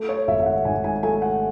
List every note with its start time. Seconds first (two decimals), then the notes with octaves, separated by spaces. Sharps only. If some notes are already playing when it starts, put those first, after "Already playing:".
Already playing: A3
0.09 C#5
0.27 G#1 E5
0.41 E5
0.46 F#5
0.65 G#2 G#5
0.84 G#5
1.03 A3 G#5
1.22 F#5